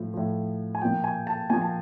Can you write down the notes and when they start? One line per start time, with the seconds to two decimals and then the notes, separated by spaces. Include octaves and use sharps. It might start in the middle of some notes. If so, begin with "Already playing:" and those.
Already playing: A2 F3
0.14 A2 F3
0.75 G#5
0.81 A#2 F3 G5
1.04 G#5
1.27 A5
1.50 A#2 F3 G#5
1.62 A5